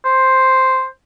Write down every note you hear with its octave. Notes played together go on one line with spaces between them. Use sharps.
C5